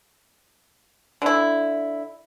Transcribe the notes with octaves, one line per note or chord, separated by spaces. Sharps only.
D3 E4